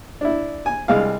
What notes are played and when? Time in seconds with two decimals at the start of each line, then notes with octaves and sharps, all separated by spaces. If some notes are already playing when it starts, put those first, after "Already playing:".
0.21 D4 E4
0.66 G#5
0.88 C2 G#3 F5